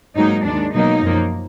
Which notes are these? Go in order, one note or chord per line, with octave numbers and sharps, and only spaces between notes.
G#2 F#3 A#3 D#4
D#2 D#3 G#3 D4
B2 F#3 A#3 D#4
F#2 F3 A#3